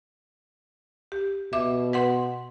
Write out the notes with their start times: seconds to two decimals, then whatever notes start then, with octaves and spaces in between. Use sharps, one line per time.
1.12 G4
1.53 B2 E5 D6
1.93 B4 F#5 C6